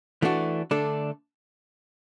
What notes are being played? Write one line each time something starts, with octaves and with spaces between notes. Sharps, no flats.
E3 A3 D4 F#4
D3 A3 D4 A4